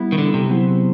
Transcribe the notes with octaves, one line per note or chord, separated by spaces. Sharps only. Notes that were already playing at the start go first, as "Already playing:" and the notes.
Already playing: G3 B3 E4
D#3
D3
C3
F#3 B3 E4 G#4 C5